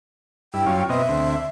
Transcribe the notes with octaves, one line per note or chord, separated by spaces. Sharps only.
G2 E4 G5
F#2 C#4 F4
B2 C4 D#5 E5
D2 C4